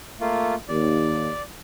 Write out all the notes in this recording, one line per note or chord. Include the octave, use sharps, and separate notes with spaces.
A3 A#3 F4
D#2 D5